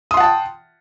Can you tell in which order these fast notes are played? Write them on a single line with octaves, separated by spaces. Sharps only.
D#6 C6 F#5 A5 G5